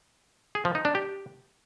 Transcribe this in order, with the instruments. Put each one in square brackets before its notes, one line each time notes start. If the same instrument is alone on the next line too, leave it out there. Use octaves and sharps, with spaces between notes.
[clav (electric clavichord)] G#4
F3
D#4
D4
G4